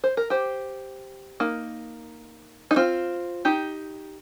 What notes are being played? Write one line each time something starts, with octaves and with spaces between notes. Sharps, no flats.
C5
A#4
G4 C5
A#3 D#4
D#4
C4 F4
D#4 G4